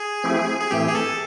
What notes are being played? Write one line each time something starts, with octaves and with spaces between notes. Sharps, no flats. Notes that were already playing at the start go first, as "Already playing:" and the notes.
Already playing: G#4
F3 A3 C4 E4 G4
G#4
A2 E3 A3 C4 G4
G#4
A4